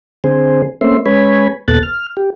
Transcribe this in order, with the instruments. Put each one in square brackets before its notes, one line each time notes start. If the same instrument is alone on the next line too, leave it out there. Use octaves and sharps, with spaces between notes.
[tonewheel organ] D3 C4 G#4 C5
A3 A#3 C4 C#4 E5 C6
G#3 C#4 B4 C#5 G#5 B5
D#2 A#2 B3 A4 F#6 A6
F6
G4